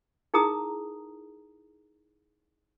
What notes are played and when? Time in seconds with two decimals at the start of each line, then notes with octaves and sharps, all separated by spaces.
0.34 D#4 E4 G#4 A#4 A#5 D#6